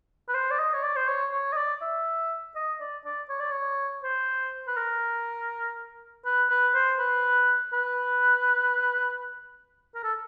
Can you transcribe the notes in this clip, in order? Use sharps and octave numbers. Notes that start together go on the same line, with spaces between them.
B4
C5
D5
D#5
C#5
D5
C5
C#5
C#5
D#5
D5
E5
D#5
D5
D5
C#5
D5
C#5
C5
B4
A#4
B4
B4
C5
B4
B4
A#4
A4